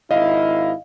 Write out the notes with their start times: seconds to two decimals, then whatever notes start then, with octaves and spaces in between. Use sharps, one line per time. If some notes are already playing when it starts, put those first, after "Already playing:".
0.11 G#1 E4 D#5 F5